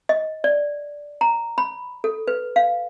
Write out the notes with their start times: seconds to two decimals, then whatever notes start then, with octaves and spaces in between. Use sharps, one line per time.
0.09 D#5
0.44 D5
1.21 A#5
1.58 B5
2.04 A4
2.28 B4
2.56 F5